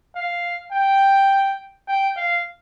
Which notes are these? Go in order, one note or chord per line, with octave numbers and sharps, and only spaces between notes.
F5
G5
G5
F5